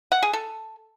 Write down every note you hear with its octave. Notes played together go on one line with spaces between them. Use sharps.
F#5
G#4
A4